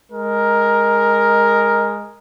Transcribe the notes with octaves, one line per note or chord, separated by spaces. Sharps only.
G#3 A#4